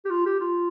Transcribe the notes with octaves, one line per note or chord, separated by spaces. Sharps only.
G4
F4
G4
F4